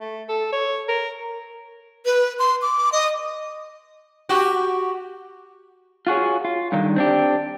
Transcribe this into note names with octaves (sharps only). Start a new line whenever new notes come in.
A3
A4
C#5
A#4
B4
C6
D6
D#5
F#4 G4
F4 F#4 G#4 C#5
F4
G2 D3 D#3
C4 D4 G4